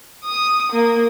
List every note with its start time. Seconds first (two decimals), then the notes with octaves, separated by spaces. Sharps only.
0.25 D#6
0.72 A#3